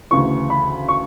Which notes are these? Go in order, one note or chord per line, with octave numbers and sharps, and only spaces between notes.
D2 C#3 E3 C#6
B5
C#6